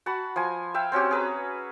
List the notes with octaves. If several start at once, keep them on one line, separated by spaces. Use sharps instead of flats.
F#4 F#5 A5 B5
F3 G#5
E5 F5 G5
C4 C#4 F#4 G4
G#4 B4 A#5